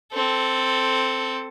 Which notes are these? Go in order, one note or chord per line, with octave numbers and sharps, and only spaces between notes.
C4 A4